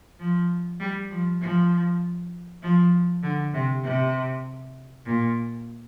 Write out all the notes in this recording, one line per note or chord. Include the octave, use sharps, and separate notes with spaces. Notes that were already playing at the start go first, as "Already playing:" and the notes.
F3
G3
F3
F3
F3
D3
C3
C3
A#2